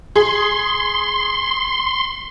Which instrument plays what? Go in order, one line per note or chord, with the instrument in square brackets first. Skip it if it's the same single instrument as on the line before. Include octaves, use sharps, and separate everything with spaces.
[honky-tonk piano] G#4 [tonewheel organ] C6